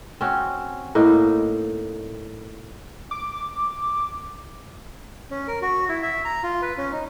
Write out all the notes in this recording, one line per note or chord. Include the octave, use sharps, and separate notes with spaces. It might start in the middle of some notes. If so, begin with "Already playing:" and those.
C4 C#4 F#4
A2 A#3 D#4
D6
C#4
A#4
F#4
E4
E5
A#5
F4
B4
C#4
D#4